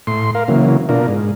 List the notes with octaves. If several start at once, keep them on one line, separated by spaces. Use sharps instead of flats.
A2 C6
A#4 F5
C#3 E3 F#3 A#3
B2 D4 F4 A#4
G#2